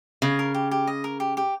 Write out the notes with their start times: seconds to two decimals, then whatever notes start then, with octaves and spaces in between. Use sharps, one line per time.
0.22 C#3 D#5
0.39 A#4
0.55 G4
0.71 G4
0.87 D#5
1.04 A#4
1.20 G4
1.37 G4